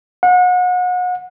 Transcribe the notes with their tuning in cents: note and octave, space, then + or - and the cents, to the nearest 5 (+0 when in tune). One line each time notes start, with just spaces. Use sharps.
F#5 -35